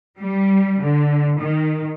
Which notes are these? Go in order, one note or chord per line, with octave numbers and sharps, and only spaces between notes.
G3
D3
D#3